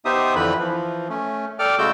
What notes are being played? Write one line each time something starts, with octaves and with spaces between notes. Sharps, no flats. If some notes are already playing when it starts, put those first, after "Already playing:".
B3 D#4 G4 C5 E5 D#6
F2 D3 E3 B4 B5
E3 F3
A3 C#4
A4 D5 G5 D6 F6
C#3 G#3 A3 F#4 E6 G6